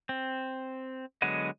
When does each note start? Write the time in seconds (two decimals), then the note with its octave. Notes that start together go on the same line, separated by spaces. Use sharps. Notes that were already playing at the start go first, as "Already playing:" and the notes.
0.09 C4
1.22 D3 F#3 G#3 B3 D#5